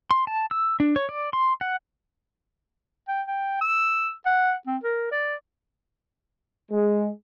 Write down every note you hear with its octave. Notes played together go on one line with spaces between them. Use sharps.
C6
A5
E6
D4
C#5
D5
C6
F#5
G5
G5
E6
F#5
C4
A#4
D5
G#3